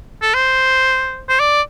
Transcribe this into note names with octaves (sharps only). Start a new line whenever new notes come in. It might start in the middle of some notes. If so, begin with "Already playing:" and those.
A4
C5
C5
D5